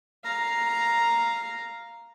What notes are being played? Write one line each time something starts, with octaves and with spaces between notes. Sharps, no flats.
F5 A#5